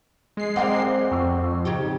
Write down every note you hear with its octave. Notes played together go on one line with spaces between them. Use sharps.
G#3 C7
C4 A#4 D5 F#5 D6
F2 C#6 E6
C#3 D#4 G4